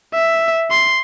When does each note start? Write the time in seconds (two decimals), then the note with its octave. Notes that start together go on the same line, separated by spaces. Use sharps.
0.14 E5
0.71 C6